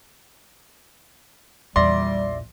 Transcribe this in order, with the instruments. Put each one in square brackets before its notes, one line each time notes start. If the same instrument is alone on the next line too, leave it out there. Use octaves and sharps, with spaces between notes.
[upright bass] A#1 E2 [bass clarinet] G3 [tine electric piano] D5 E5 A#6 [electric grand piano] C6